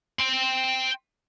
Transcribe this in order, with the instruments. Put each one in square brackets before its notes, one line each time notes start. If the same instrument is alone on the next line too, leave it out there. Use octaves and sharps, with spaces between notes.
[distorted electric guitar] G5 C6